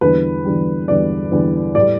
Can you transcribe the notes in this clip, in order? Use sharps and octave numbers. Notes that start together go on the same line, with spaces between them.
E2 D3 G3 B4
E2 D3 G3
E2 D3 G3 D5
E2 D3 G3
A2 G3 D5